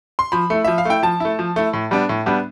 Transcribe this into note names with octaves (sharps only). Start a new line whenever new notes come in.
C6
F3 B5
A3 E4
F3 E5
F5
A3 E4 G5
F3 A5
A3 E4
F3
A3 E4
A2
G3 B3 D4
A2
G3 B3 D4